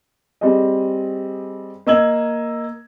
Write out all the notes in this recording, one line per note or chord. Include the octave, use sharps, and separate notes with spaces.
G3 C4 G#4 D#5
A#3 D#5 E6 G#6 F#7